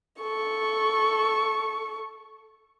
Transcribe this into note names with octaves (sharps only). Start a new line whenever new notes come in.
A4 C#6